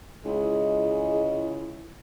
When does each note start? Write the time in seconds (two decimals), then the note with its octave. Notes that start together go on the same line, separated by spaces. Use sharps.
0.25 C#2 G#3 E4 G#4